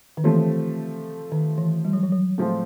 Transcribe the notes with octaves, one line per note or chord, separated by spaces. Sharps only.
D#3
C3 E3 F3 A3 C4
D#3
E3
G3
F#3
F3
F#3
A2 F3 G#3 C4 F4